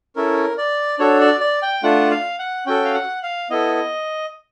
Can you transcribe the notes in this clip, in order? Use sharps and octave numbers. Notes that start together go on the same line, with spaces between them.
C#4 E4 A4 A#4
D5
D4 F#4 A4 C#5
D5
D5
G5
A3 D4 F4 F#5
F5
F#5
C#4 F#4 A4 G5
F5
F#5
F5
B3 E4 A4 D#5